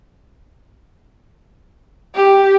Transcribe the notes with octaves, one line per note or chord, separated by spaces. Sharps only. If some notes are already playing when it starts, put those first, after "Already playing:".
G4